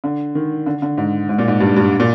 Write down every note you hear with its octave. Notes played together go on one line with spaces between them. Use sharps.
D3
D#3
D3
D3
G#2
G#2
A#2
G#2
G2
G2
A#2